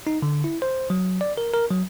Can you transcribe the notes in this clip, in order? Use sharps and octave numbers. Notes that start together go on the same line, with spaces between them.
D#4
D3
E4
C5
F#3
D5
A#4
A#4
F#3